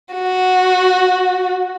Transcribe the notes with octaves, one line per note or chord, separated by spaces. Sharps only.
F#4